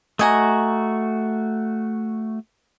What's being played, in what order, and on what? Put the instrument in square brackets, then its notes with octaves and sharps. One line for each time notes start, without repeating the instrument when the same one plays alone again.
[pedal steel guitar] A3 F#4 [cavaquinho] D#5 G#5 A#5